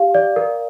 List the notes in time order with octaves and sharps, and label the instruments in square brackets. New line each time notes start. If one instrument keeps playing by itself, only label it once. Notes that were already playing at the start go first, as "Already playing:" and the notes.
Already playing: [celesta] G4 F5
D5
A#4